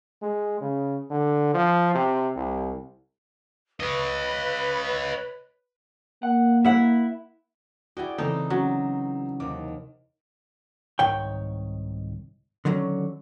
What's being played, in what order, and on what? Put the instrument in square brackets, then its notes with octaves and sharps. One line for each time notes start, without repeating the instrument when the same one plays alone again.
[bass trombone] G#3
C#3
D3
F3
C3
C2
[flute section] B4 [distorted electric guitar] C#5 D#5
[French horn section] A#3 [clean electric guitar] F#5
[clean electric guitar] E4 [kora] E5 F#5
[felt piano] E4 F#4 [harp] G#4 D5 G5
[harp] C#3 E3 [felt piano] C4 A4 [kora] D#4
[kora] F#3 [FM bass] C#4
[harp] D#2 C3 [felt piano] D6
[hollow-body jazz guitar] C2 G#2 D#3 C#5 G5
D3 D#3 F#3 C#4